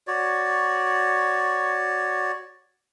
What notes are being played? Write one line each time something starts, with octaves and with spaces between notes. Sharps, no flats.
F#4 C#5 D5